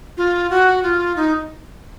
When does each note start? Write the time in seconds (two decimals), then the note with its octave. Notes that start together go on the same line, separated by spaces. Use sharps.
0.17 F4
0.50 F#4
0.83 F4
1.16 D#4